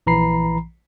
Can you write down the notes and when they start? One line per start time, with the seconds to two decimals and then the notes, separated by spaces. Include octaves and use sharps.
0.07 A#1 E3 A#5 B5 C7